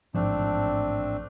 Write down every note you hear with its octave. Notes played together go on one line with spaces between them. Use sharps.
A1 G#2 F3 A3 C4 D4